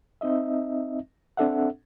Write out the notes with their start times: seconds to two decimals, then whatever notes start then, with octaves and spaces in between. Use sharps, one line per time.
0.21 C4 D#4 D#5 E5
1.37 C4 D4 A4 E5 F#5